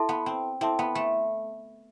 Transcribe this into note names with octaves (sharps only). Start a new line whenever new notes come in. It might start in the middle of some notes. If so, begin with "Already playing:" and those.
Already playing: E4 A4 E5 A5 C6
B3
C4
C4 E4 A4 E5 A5 C6
B3
A3